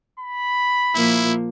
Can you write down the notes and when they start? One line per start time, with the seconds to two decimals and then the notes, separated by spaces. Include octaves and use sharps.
0.19 B5
0.95 A#2 F3 A#3 E4